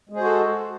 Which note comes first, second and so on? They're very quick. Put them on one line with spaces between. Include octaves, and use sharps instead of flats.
G#3 G#4 C5 F#4 A4